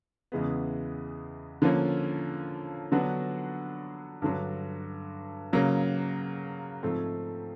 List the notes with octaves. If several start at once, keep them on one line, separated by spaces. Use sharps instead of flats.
E2 C#3 E3 G#3 B3
D3 F3 A#3 C#4
D3 F#3 B3 D4 F#4
G2 D3 F#3
C#3 F#3 A#3
G#2 F3 A3 C4